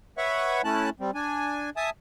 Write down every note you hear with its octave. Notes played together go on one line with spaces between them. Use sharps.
B4 C#5 E5 F#5 B5 C#6
A3 C#4 E4 A5 F#6
G3 C4
D4 G#5
E5 G#5 A5 D#6